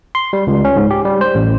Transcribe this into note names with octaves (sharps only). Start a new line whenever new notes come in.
C6
G3
C#2
C#4
G#2
G4
G3
C5
A1